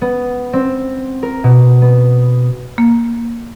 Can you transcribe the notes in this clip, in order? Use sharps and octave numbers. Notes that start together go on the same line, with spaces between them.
B3
C4
A#4
B2
B3
A#3